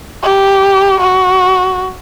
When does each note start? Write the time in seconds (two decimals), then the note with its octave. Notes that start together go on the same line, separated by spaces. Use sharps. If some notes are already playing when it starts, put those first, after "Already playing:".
0.23 G4
1.00 F#4